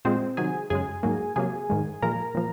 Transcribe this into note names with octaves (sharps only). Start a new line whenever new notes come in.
A#2 F3 G#3 C4 C5
C3 D#3 F#3 G#4 G#5
F#2 C#3 G#3 G#4 G#5
G#2 F#3 A#3
C3 F#3 A#3 G#4 G#5
G#2 D#3 G#3
A#2 F3 G#3 A#4 A#5
A#2 F3